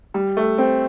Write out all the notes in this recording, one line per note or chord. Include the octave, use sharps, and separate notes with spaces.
G3
A3
C4